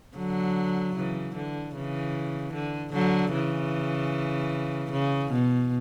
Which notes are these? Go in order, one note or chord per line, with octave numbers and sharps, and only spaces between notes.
D3 F#3
C#3 E3
D3
C#3 E3
D3
D3 F#3
C#3 E3
C#3
B2